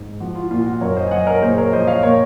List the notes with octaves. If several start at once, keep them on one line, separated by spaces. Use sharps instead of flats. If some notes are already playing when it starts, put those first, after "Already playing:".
Already playing: G#2
F3 F#4
F4
A#2 F4
F#4
F#2 A#4 C#5
C5 D#5
G#5
F#2 D#5 F#5
A#4 C#5
A#2 G#4 C5
A#4 C#5
F3 C5 D#5
C#5 F5
A#2 A#4 C#5